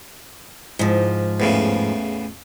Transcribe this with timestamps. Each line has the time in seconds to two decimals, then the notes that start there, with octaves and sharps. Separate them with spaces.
0.79 G#2 F3
1.40 E2 A2 C#3